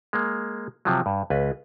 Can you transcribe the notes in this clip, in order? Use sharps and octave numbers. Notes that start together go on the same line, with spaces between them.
G#3 A#3
C3 F3 F#3
G2
C#2 B4